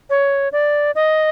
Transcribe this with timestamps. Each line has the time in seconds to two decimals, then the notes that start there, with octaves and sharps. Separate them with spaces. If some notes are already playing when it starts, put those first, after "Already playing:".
0.10 C#5
0.53 D5
0.95 D#5